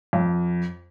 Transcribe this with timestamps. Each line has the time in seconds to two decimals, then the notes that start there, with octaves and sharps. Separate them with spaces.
0.13 F2